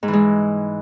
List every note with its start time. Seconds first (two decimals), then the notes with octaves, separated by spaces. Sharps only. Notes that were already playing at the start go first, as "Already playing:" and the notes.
0.03 G#2
0.08 E3
0.13 G#3